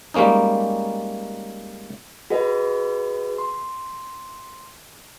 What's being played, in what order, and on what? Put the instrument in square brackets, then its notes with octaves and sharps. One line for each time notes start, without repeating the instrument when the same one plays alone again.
[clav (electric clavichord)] G3 G#3 A#3 C#4 D#4
[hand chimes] F#4 G#4 B4 D#5
C6